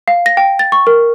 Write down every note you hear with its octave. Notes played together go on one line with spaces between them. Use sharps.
F5
A#6
G5
A6
C#6
A#4